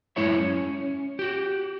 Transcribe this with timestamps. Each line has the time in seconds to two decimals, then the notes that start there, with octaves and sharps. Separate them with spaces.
0.16 F#2 G#3 E4 C#5 E5
0.38 C#4
1.19 F#4 G4